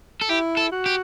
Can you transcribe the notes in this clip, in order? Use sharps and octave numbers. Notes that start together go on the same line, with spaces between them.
A4
E4 G4
A4
F#4
G4